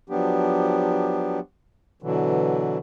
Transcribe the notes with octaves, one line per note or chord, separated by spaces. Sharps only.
F3 F#3 B3 D4 G4
B2 D3 E3 F#3